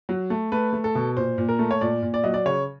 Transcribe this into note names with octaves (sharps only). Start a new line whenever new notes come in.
F#3
A3
A3 B4
A3
A4
B2
A#2 C5
A#2
A#4
A3
C#5
A#2 D5
A#2
D5
F#3 D#5
D5
C#3 C#5